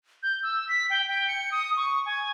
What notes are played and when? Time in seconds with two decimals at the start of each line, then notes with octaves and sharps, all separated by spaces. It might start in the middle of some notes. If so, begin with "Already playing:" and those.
0.23 G6
0.43 E6
0.69 B6
0.90 G5
1.08 G5
1.28 C#7
1.52 D#6
1.77 C#6
2.06 G#5